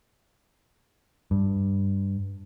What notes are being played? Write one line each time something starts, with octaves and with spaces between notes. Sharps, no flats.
G2